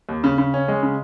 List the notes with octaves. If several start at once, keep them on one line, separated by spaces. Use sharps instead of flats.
D#2
C#3
C#3
C#4
G#3
C#3